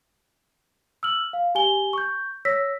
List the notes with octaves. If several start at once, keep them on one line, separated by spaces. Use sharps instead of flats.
E6 F6 F#7
F5
G4 G#5 G7
C#6 G6
C#5 E6 A#6 B6